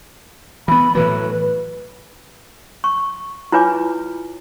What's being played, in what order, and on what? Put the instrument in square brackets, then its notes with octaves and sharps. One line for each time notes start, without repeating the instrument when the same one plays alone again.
[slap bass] E3 B3 [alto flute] B5
[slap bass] A2 E3 F#3 [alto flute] B4
[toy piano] C#6
E4 F4 B4 C#5 G#5 D6